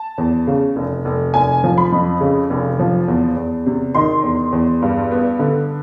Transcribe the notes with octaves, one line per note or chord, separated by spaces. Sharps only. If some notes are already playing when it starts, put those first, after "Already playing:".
Already playing: A5
E2
C#3
F1
F1
F1 G#5
F3
B5
F2
C#3
F1
F3
E2
E2
C3
D#3 C6
E2
E2
G2
B3
D3